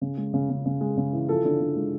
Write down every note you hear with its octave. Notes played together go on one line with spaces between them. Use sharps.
C#3
G#3
C#3
C#3
C#3
G#3
C#3
E3
F3 A4
D3
D3
G#3